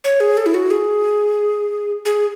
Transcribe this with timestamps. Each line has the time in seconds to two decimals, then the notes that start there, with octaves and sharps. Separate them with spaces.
0.04 C#5
0.20 G#4
0.37 A4
0.46 E4
0.54 F#4
0.70 G#4
2.05 G#4